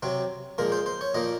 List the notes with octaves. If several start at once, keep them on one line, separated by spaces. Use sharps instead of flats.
C3 F#3 C4
A#2 F3 G#3 A#4
C5
C5
C#5
A#2 F3 A#3 D#5